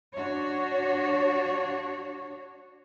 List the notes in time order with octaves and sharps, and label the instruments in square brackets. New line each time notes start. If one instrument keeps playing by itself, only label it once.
[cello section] D4 F#4 C#5